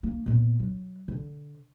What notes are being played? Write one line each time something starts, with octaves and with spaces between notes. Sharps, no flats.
A#3
A#2 B3
F#3
D3